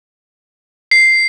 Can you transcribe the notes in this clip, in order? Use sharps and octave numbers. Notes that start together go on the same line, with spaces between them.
C7